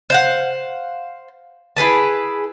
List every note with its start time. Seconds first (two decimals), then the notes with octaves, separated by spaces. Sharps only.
0.10 C5 F5 F#5
1.77 E4 G#4 B4 A5